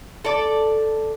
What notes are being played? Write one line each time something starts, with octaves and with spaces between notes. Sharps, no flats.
A4 D5